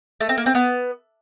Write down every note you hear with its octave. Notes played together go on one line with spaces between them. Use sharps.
A3
C4
A#3
C4
B3